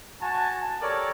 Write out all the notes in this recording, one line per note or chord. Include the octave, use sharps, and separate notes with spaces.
F#4 G#5 A5
G4 A4 A#4 C#5 D5